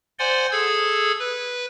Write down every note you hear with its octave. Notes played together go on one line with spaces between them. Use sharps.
C5 D5 F#5 G#5 C6
G#4 A4 E6 G#6
B4